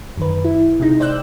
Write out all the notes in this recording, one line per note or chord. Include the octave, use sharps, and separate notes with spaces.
F#2 D#3 B4
E4
C3 G#3 D#4
C5 D5 G5 E6 F#6 G6